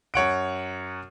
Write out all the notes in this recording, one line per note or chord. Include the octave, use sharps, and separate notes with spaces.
F#2 C#5 F#5 D7